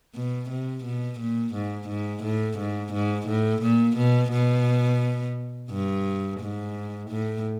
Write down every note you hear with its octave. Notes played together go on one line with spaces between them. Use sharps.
B2
C3
B2
A#2
G#2
G#2
A2
G#2
G#2
A2
A#2
B2
B2
G2
G#2
A2